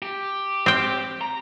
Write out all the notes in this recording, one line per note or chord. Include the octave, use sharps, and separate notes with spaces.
G4
C4 G5
A#5